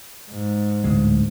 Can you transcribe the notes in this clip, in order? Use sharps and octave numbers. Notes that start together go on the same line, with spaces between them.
G#2
D1 D2 G#3